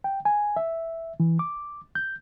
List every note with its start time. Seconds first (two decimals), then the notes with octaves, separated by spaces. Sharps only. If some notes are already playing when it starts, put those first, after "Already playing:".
0.04 G5
0.25 G#5
0.57 E5
1.20 E3
1.39 D6
1.95 G6